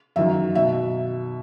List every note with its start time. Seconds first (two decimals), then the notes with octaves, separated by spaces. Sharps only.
0.16 F#2 D#3 E5
0.55 B2 E5